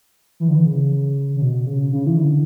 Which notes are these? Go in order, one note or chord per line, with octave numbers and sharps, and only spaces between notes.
E3
D3
E3
C#3
C#3
B2
C#3
C#3
E3
D3